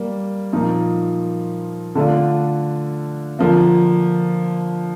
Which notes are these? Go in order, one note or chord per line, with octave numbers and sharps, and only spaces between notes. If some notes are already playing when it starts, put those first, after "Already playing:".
Already playing: G3 A#3
A#2 F3 A#3 D#4
D3 A3 D4 F4
D3 F3 A#3